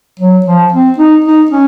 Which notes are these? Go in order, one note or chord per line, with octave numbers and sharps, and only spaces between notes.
F#3
F3
C4
D#4
D#4
C#4